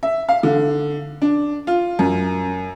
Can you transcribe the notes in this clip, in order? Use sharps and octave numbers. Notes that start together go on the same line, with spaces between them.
E5
F5
D3
D4
F4
F#2